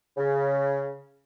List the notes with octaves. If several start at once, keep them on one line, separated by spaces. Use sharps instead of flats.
C#3